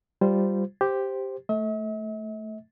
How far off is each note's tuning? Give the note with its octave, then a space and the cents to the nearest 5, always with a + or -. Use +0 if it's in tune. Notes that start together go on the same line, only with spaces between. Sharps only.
G3 +0 F4 +0 C5 -15
G4 +0 C5 +0
A3 +0 E5 -45